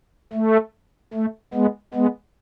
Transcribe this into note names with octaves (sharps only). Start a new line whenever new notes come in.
A3
A3
G#3 B3
G#3 B3